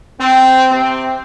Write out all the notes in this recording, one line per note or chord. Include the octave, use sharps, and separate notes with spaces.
C4
C3 C4